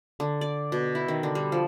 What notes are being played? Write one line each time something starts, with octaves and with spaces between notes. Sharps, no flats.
D3
D5
B2
E4
D#3
D3
G3
F3